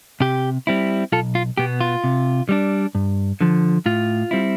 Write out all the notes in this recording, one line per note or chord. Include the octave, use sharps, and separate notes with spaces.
C3 G4
G3 C4 E4
B1 F4 A4
F4
B2 B3 G4
F4
C3
G3 B3 D4
G2
D3 F3
A2 F4
G3 C4 E4